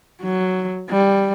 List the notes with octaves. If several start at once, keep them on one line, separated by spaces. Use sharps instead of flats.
F#3
G3